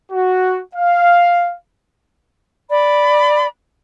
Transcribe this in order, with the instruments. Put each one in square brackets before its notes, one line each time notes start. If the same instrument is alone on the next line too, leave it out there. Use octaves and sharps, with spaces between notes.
[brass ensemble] F#4
F5
[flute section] D5 B5